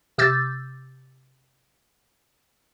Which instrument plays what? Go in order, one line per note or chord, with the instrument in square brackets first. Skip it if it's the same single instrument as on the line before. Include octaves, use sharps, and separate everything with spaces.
[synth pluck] C3 D6 E6 G6 A6